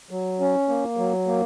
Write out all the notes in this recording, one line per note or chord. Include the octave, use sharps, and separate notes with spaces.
F#3
C#4
A#3
F#3
A#3